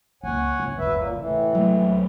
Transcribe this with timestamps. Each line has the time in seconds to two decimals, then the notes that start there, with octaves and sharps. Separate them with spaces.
0.23 C#2 A#3 C#5 F#5 G#5
0.60 C#2 G#2
0.78 G1 D#2 F#3 B4 E5
0.96 A#2 A#3
1.16 C2 A2 E3
1.55 F#3 A3